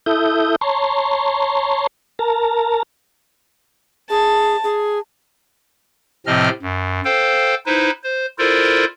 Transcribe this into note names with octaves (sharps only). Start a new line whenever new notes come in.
E4 A4 E5 D#6 G6
C#5 A5 A#5 C6 C#6
A#4 A5 A#5
G#4 A5
G#4
A2 C3 F3 C4 D#5 F6
F#2
A4 C5 F5 G5
D#4 E4 B4 C5
C5
E4 F4 A4 A#4 C5 D5